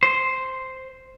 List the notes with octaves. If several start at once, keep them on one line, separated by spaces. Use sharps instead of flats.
C5